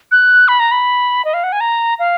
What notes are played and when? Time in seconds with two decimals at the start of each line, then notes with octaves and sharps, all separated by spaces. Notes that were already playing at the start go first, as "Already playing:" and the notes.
0.12 F#6
0.48 B5
0.60 A#5
0.72 B5
1.25 D#5
1.34 F5
1.44 F#5
1.52 G#5
1.61 A#5
1.99 F5